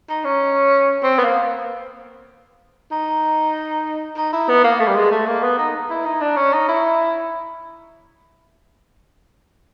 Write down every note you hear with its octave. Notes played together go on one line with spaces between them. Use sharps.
D#4
C#4
C4
B3
A#3
D#4
D#4
E4
B3
A#3
A3
G3
G#3
A3
A#3
B3
D#4
E4
D#4
D4
C#4
D#4
E4